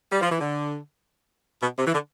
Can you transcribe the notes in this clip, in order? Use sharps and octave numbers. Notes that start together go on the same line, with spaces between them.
G3
F3
E3
D3
B2
C3
E3
D3